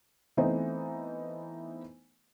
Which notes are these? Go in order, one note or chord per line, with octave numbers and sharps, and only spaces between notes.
E3 A3 B3 C4 D#4 C5